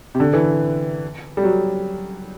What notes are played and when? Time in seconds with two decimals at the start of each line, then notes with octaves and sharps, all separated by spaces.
0.15 C3
0.20 D3
0.33 E3
1.37 G3
1.44 F#3